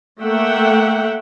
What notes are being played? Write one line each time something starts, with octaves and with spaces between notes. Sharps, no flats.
A3 A#3 E5 F#5 G5